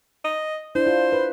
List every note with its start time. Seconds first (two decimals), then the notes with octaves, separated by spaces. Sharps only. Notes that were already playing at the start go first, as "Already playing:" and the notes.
0.24 D#5
0.75 D4 E4 C5
0.87 F4
1.12 B4